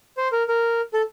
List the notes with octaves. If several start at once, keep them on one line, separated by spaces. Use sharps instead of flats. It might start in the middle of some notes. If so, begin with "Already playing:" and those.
C5
A#4
A#4
A4